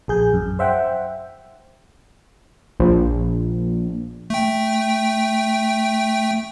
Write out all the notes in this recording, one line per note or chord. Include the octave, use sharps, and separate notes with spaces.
A#1 G#4 G6
F#2
C5 E5 F#5 G5
A#1
A3 G5